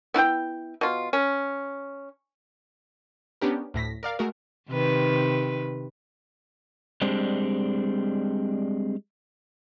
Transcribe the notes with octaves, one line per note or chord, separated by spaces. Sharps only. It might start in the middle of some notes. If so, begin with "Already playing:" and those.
B3 E4 F5 G5
B2 F4
C#4
B3 C#4 D4 G4 A#4
D2 A2 A#6 B6
A#4 D5 F5
G#3 A3 F#4 A#4
C3 D#3 B4
G3 G#3 C4 D4